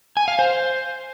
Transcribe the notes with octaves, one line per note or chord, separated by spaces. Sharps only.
G#5
F5
C5